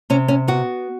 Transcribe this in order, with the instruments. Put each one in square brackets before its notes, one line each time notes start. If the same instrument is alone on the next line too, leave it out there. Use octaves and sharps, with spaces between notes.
[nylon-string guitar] C3 C#4
C#4
B3 F#4